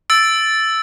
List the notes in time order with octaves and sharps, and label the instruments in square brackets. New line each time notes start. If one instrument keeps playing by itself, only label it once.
[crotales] E6 A6 D7